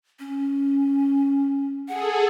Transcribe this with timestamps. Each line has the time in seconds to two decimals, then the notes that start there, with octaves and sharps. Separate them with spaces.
0.19 C#4
1.88 G#4 A4 F#5